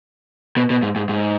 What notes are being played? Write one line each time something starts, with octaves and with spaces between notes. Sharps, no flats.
B2
B2
G#2
G#2
G#2